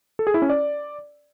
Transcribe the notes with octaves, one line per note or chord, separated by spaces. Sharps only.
A4
G#4
E4
C#4
D5